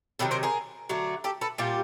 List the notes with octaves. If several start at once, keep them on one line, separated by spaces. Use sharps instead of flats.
C3 D#3 F#3 A4 B4
A#4 C5
G#4 A#4
D3 F#3 A3
G4 A4
A4 B4
A#2 G3 F4 G4